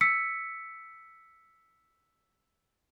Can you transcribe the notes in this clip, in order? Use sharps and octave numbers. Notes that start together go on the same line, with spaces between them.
E6 B6 C#7